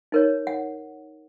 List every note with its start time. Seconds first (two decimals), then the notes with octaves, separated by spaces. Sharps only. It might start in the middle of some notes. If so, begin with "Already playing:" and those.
0.12 D#4 A#4 C#5
0.47 F#5